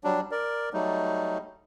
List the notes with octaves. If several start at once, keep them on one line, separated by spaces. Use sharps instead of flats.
F#3 G3 D4
A#4 D5
F#3 G3 A3 D#4